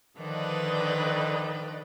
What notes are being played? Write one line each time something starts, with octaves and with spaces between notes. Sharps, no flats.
D3 D#3 F3 B4 D5 D#5